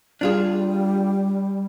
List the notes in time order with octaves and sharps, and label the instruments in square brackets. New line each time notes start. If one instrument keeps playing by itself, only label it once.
[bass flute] G3 [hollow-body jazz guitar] D4 F4 G#4